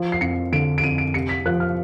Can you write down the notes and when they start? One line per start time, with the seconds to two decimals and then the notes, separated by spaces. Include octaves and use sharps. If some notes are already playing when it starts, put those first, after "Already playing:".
Already playing: F3
0.12 C7
0.21 F2 C#7
0.52 D3 D7
0.78 D7
0.83 F2 D#7
0.98 D7
1.14 C3 C#7
1.29 B6
1.45 F3 F#6
1.60 F6